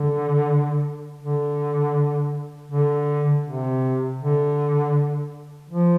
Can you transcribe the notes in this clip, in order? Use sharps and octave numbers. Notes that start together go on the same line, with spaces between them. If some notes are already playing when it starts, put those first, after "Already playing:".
Already playing: D3
D3
D3
C3
D3
F3